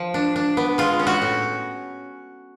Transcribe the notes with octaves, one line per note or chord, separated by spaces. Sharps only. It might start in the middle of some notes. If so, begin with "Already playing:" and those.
Already playing: F3
D4
D4
B3
G#3 F4
C#4
F#4
A2